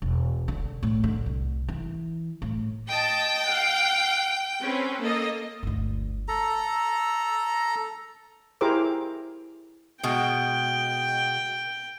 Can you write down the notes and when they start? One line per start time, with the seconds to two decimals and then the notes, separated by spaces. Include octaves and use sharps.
0.02 E1
0.48 D3
0.83 A2
1.04 D3
1.26 C2
1.69 E3
2.42 A2
2.88 D#5 G5 A5
3.46 F5 F#5
4.62 C4 C#4 B4
5.00 A#3 A4 D#5
5.63 G1 D2
6.28 A4 A#5
8.61 E4 G4 G#4 A#4 C5 D6
10.03 B2 G#3 G5